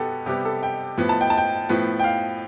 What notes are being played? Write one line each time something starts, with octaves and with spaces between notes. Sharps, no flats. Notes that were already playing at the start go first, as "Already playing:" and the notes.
Already playing: B2 B3 G4 A4
C3 G3 B3 G4
A4
G5
A2 F3 B3
A5
G5
A5
G5
A2 F3 B3
G5
F5